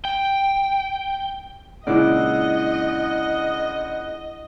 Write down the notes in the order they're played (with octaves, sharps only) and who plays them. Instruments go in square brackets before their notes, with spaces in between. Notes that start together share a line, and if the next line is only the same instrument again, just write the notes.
[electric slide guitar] G5
[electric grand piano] A#2 C#3 G#3 [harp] D4 E4 D5 [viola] D#5 [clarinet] F#5